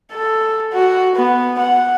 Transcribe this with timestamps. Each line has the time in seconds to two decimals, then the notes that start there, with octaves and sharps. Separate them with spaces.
0.14 A4
0.73 F#4
1.16 B3
1.59 F#5